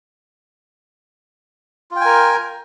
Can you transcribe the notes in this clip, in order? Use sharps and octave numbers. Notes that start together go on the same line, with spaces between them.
F4 A#4 G5 G#5